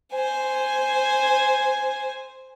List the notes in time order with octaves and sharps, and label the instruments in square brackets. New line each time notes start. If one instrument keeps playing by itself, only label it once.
[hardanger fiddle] C5 G#5